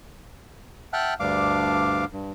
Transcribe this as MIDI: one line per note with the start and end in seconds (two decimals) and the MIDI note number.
0.93 1.14 76
0.93 1.14 78
0.93 1.14 79
0.93 1.14 81
0.93 1.14 89
0.93 1.14 90
1.20 2.05 38
1.20 2.05 43
1.20 2.05 62
1.20 2.05 77
1.20 2.05 86
2.13 2.32 43